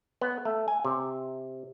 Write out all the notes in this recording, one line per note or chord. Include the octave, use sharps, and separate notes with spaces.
B3
A3
G#5
C3